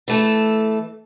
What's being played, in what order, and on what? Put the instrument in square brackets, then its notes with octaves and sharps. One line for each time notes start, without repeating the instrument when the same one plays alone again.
[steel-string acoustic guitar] E3 A3 A4